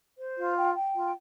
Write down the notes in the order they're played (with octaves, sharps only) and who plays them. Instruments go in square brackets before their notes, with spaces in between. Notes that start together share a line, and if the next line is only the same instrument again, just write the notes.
[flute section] C5
F4
G5
G5
F4